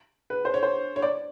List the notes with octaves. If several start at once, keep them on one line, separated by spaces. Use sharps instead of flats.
B4
C5
C#5
C5
C#5
D5